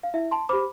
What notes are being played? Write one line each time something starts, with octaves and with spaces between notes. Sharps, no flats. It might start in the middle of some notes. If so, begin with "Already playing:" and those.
F5
E4 E5
A5 C6
G4 C5 B5 D6